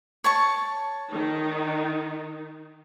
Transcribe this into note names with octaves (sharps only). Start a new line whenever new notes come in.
C#5 A5 C#6
D#3 D#4